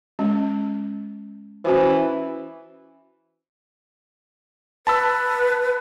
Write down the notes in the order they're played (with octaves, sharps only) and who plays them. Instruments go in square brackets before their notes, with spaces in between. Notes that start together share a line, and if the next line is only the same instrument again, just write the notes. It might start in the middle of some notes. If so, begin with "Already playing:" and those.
[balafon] G#3 C#4
[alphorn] E3 [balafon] C#4 F#4 C5
[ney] B4 [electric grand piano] A5 B5 E6